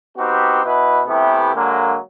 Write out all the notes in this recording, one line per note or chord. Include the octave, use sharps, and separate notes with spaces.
B3 C4 D#4 F#4 G4
B2 E4 B4
C3 E3 A3 B3 E4 G4
D3 F#3 G#3 A#3